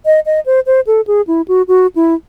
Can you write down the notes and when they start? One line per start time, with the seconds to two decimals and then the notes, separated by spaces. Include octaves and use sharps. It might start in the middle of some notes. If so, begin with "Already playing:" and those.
0.06 D#5
0.26 D#5
0.46 C5
0.66 C5
0.87 A4
1.07 G#4
1.27 E4
1.48 F#4
1.68 F#4
1.96 E4